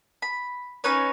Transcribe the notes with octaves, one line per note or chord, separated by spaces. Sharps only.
B5
C#4 D#4 B4 C#5